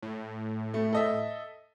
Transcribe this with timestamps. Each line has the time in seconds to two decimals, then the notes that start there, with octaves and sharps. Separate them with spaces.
0.03 A2
0.74 A3
0.93 A4 D#5 E5